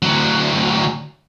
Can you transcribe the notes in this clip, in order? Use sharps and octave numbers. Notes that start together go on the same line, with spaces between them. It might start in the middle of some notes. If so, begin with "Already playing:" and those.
D2 F#3